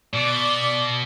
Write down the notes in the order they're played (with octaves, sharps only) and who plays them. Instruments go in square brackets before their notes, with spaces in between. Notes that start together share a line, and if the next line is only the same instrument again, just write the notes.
[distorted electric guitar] B2 [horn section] D5